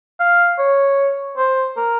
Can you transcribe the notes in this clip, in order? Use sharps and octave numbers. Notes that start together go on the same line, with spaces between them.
F5
C#5
C5
A#4